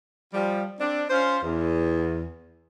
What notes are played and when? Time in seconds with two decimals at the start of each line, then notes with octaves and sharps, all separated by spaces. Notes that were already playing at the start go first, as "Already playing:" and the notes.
0.32 F3 G3
0.79 C4 D4
1.09 C#4 F4 C5
1.42 E2